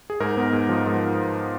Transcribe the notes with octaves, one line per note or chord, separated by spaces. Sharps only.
G#4
G#2 A#4
B3
G#2
F3
G#2